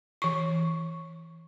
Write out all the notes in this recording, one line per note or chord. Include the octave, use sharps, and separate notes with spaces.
E3 C#6